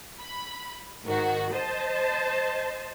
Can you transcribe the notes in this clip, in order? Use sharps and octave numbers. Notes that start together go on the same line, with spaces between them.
B5
G#2 D#3 F#4
C5 D#5 A5